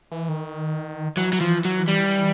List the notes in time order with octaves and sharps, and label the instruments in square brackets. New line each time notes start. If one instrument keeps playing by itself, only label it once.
[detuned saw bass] E3
D#3
[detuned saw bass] E3 [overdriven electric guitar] F#3
[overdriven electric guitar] F#3
F3
F#3
G3